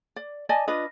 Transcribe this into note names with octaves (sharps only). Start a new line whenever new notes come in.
D5
D5 D#5 G#5 A5
D4 F4 B4 D#5